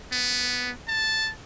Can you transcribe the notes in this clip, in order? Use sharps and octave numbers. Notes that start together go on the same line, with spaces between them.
B3
A5